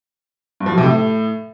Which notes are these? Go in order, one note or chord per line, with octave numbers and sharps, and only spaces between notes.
G2
F3
F#3
C3
A2